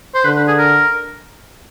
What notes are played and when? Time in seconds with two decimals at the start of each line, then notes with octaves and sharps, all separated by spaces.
0.15 C5
0.25 D3 B4
0.36 B4
0.47 G#4
0.58 A#4